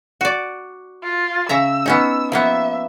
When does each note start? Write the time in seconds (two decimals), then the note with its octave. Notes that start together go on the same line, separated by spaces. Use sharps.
0.21 F#4 D5
1.03 F4
1.49 C#3 E5 A#5 E6
1.86 B3 C#4 D#4
2.32 F3 A#3 B3 E5